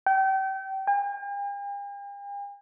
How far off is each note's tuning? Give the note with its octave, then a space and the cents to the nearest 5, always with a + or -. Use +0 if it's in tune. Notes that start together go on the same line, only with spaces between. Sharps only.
G5 -30
G5 +45